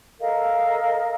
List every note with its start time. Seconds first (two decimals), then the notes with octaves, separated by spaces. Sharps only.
0.20 A4 A#4 D#5 F5